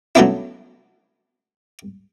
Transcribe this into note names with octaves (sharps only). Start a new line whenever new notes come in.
F#3 A3 B3 C#4 D4 E4